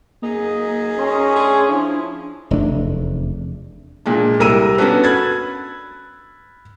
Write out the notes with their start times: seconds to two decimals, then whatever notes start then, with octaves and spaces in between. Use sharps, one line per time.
0.22 F#2 A#3 D#4 G#4
0.98 C#4 C6
1.35 A3 D4 G#4 C6
1.69 F3 D4 E4
2.51 F1 E2 A3 D4
4.06 A#2 G#3 D4
4.39 C2 G3 A#4 A#5 E6 D#7
4.78 B3 C#4 D4 F#4 A4 B4
5.04 B5 F#6 G#6 A6